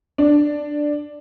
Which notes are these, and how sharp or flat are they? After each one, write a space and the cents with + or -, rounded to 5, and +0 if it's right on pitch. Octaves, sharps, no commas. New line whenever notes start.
D4 +5